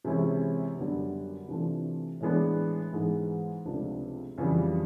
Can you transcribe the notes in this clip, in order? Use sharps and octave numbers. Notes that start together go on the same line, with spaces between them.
C3 E3 G#3 C#4 E4
F#2 D3 G3 B3
C3 E3 A3 D4 F4
A2 E3 G#3 B3 D4
G#2 E3 G#3 B3
C#2 C3 F3 A3 D4
F2 C#3 E3 G3